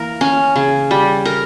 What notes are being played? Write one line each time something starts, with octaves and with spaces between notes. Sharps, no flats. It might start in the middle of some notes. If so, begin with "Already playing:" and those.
Already playing: E3 A#3 A#4
C#4
C#3
G3
A#4